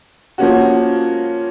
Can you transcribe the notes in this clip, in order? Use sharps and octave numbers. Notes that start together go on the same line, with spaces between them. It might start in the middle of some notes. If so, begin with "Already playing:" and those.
F3 A#3 C#4 F#4